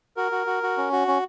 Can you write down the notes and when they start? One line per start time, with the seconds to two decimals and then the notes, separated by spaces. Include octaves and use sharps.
0.17 F#4 A#4
0.32 F#4
0.47 F#4
0.63 F#4
0.77 C#4
0.92 F#4
1.08 C#4